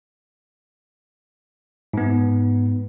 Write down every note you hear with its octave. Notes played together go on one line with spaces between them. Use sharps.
G#2 B3